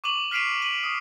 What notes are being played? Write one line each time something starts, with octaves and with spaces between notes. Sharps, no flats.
C#6 D6 D#7 F#7
F6 B6 C7 D7 D#7 F7
D#7 F#7
D#6